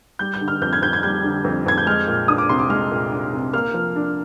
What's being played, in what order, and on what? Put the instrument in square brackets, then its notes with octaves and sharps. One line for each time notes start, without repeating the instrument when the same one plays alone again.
[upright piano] G3 G6
G6
D3
F6
F2 G6
G#6
F2 G6
G#6
G3 G6
D3
F2
F2 G#6
G6
G#3 F6
A#2
D4 D#6
D6
C2 C6
D6
G#3 F6
A#2
D4
C2
A#3 F6
F3
D4